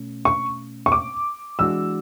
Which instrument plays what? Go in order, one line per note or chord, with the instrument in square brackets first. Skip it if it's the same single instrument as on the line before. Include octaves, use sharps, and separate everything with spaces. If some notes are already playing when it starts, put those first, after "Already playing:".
Already playing: [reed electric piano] B2 A3 C#4
[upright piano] C#6
C#6
D6
[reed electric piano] E3 G#3 D4 F#4 [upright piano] E6